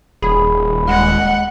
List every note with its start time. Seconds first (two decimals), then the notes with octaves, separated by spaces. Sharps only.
0.22 D#1 G#4 B5
0.89 G#3 F#5